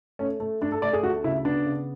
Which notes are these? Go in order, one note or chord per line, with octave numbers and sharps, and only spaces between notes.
A3 C#4
A3
A3 D4
A4
A3 D5
G#4
D2 F#4
C#3 E4
B3 D4
C#3